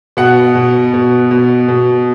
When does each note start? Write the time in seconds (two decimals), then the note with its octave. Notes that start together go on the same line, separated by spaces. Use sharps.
0.17 B2 F#5
0.55 B2
0.94 B2
1.31 B2
1.68 B2